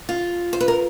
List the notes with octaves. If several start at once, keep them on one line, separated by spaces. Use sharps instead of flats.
F4
C5
B4
A#4